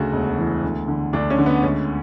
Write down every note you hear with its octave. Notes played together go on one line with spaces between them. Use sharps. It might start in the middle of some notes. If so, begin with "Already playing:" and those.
Already playing: D2 C#3 F#4
E1
E3
D2
D3
D2 D4
C#4
D3
B3
C#2 C#4